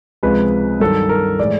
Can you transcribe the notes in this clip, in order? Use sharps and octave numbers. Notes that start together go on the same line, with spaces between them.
C#2 C3 F3 G#3 B4
G2 D#3 F#3 A4
A#4
A2 E3 G#3 D5